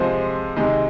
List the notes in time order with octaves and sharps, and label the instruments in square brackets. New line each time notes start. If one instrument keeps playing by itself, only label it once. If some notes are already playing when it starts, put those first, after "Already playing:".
Already playing: [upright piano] C3 F3 G#3 C5
C3 D#3 G#3